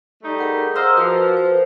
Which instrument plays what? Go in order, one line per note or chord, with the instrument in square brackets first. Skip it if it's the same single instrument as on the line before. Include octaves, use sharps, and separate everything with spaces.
[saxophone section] G3 A3 D#4
[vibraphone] G#4 A#4 F#5
[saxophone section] C5 D#5 F5 [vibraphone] A#5 E6
[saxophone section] F3 [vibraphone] F#4 A#4 B4
[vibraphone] C5